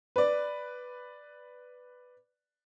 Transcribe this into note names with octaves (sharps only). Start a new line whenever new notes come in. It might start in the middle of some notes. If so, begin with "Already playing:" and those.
B4 D5